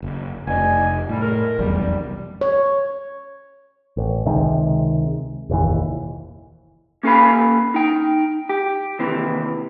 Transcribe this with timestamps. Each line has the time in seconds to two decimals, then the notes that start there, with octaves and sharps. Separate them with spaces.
0.02 F#1
0.47 F1 D4 D#5 G#5
1.10 F#2 A2 G3
1.21 G#3 A#4
1.59 F1 B1 E2 G3
2.41 C#5
3.97 A1
4.26 C#2 C3 D#3 G#3
5.50 F1 A#1 D#2 E3
7.03 A#3 C#4 A4 F5 G#5 B5
7.74 D#4 G5
8.49 G4
8.99 D#2 C3 E3